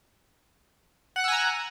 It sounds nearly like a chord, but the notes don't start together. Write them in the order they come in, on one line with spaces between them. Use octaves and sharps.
F#5 F#6 E6 G#5 A#5